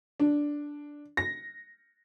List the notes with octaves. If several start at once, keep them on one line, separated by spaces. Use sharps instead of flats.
D4
A#6